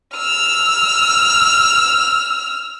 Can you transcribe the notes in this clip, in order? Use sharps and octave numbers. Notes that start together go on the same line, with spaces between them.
E6 F6